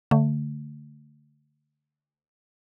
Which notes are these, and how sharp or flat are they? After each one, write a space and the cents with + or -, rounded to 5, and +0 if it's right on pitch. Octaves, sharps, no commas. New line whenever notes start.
D3 -15 A3 +25